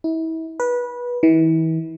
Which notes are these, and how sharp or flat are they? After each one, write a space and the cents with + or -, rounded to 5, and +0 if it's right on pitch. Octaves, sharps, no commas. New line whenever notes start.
E4 -35
B4 -20
E3 -35